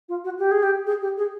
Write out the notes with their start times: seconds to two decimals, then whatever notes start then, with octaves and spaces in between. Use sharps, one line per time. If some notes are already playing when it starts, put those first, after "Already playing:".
0.09 F4
0.24 F#4
0.39 G4
0.51 G#4
0.63 G4
0.87 G#4
1.02 G4
1.18 G#4